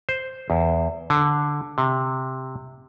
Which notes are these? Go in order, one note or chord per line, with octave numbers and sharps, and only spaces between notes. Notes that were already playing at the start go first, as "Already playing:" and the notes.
C5
E2
D3
C3